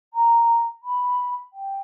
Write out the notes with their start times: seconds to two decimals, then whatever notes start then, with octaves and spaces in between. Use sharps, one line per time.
0.13 A#5
0.82 B5
1.53 G5